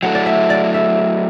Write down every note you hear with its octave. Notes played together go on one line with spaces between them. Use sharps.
F#3 A3 E4 A4 F#5
D5
E5
D5
E5